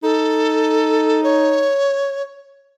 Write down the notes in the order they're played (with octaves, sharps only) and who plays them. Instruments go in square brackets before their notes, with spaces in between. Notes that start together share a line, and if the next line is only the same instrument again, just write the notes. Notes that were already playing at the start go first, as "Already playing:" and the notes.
[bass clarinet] D#4 [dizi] A4
[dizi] C#5